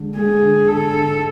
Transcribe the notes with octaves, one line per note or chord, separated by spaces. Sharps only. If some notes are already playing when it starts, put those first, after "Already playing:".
Already playing: D3 G#3
G#3 G#4
D3
D3 A4
D3